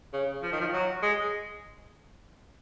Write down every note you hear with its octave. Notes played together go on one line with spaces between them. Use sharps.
C#3
F3
D#3
F3
F#3
G#3